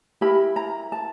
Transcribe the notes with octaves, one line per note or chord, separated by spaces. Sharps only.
E4 G4 A#4 B5
A#5
A5